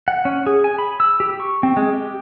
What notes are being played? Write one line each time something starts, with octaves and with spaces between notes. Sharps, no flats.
F#5
C#4
G#4
G#5
B5
E6
G4
C#6
C4
G#3
G4